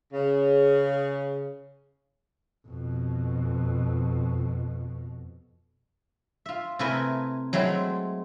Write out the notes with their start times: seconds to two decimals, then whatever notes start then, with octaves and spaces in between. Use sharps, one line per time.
0.13 C#3
2.67 F2 B2
6.46 F4 E5
6.79 C3 A3 E4 A#4 B4 G#5
7.53 F#3 G#3 A3 C4 E4